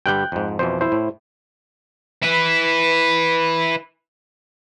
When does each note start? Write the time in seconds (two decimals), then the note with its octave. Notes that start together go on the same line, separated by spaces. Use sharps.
0.06 G2 D3 G3 G5 F#6 G6
0.32 F2 G#2
0.59 F2 B2 E3 C5
0.81 E4 C5
0.92 A2
2.23 E4 B4